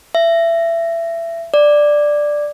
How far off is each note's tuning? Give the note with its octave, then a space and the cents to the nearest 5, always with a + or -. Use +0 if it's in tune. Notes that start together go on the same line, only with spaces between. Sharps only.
E5 +25
D5 +5